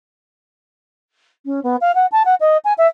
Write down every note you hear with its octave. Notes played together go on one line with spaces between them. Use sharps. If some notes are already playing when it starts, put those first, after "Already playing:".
C#4
B3
F5
F#5
A5
F#5
D#5
G#5
E5